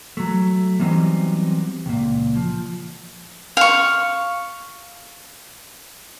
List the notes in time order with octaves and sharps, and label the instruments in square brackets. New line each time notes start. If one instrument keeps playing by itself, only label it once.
[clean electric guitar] F#3 A3
E3 F#3 G3 B3 C4 D#4
C#2 A#2
F3
[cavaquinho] F5 C#6